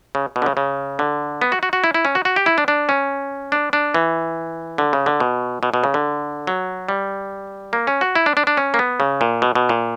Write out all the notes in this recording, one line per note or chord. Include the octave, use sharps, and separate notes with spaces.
C#3
B2
D3
C#3
C#3
D3
B3
F#4
F#4
F#4
E4
E4
C#4
F#4
F#4
G4
E4
D4
D4
C#4
D4
D4
E3
D3
C#3
D3
B2
B2
B2
C#3
D3
F#3
G3
A#3
C#4
F#4
E4
D4
D4
D4
C#4
A#3
B3
C#3
A#2
B2
B2
A#2